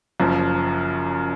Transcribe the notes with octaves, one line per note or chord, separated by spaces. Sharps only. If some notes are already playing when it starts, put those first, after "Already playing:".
F#1 F#2 F3